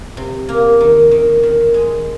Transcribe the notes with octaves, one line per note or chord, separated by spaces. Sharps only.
C3
A#3
D#3
D#3
D#3
G#3